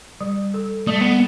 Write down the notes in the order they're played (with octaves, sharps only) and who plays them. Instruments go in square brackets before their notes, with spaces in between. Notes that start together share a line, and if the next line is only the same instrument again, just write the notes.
[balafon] G3
A4
[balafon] G3 [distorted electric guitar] A3
[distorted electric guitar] B3